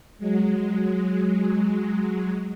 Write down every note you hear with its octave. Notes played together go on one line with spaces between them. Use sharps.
F#3 G#3